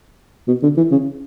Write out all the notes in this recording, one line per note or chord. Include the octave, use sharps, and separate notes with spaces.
B2
D3
E3
C#3